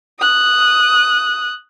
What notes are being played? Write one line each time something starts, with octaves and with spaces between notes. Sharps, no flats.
D#6 F#6